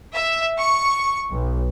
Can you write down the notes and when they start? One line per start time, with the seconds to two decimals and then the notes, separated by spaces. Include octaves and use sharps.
0.14 E5
0.58 C#6
1.31 B1